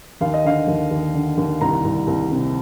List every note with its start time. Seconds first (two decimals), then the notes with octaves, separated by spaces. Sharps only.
0.21 D#2 F5
0.34 D#5
0.45 D3 F5
0.67 D#2
0.90 D#2
1.14 D3
1.37 D#2
1.61 C2 A#5
1.84 C2
2.07 C2
2.31 C3